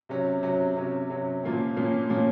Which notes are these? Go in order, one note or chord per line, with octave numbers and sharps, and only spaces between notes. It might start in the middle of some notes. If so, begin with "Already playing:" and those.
C3 F#3 C#4
C3 F#3 C#4
C3 F#3 C#4
C3 F#3 C#4
A#2 F3 A#3 C#4
A#2 F3 A#3 C#4
A#2 F3 A#3 C#4